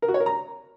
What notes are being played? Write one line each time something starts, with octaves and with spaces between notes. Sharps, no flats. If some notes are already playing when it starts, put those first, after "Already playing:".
A#4
F#4
C#5
A#4
A#5